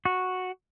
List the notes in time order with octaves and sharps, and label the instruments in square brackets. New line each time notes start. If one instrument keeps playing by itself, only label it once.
[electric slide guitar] F#4